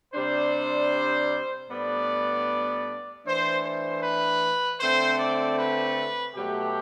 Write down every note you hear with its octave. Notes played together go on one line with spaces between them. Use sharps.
C3 G3 D4 C5
A2 G3 B3 D4 D5
E3 A3 D4 C5
C5
B4
D3 A3 C4 C5
D5
B4
B2 F#3 A3 G4